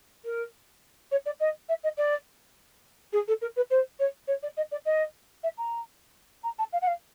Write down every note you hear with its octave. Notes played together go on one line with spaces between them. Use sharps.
A#4
C#5
D5
D#5
E5
D#5
D5
G#4
A4
A#4
B4
C5
C#5
C#5
D5
D#5
D5
D#5
E5
A#5
A#5
A5
F5
F#5
F5